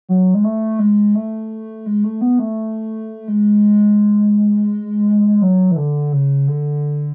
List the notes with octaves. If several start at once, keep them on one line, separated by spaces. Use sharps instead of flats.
F#3
G#3
A3
G#3
A3
G#3
A3
B3
A3
G#3
F#3
E3
D3
C#3
D3